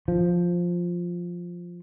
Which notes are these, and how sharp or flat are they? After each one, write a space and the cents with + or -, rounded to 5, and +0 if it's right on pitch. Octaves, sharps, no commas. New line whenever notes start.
F3 +5